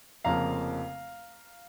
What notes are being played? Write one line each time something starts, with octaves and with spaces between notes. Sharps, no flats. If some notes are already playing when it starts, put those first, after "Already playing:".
F1 F2 C#3 F3 A#3 F5 A#5